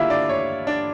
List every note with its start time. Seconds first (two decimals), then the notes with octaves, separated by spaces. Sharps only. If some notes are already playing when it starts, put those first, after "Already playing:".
Already playing: D3 G3 A#3 E4 F4 E5 F5
0.10 D4 D5
0.29 C#5
0.67 D4 D5